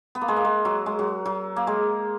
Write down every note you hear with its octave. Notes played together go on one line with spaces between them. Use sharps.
B3
A#3
G#3
A#3
G#3
F#3
G#3
F#3
F#3
A#3
G#3